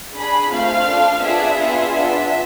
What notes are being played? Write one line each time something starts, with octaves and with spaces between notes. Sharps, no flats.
D4 G#4 B5
A3 C4 F4 F5
D4 F4 A4
B3 D4 F4 G#4 E5
B3 F4 G#4
B3 D4 F4 E5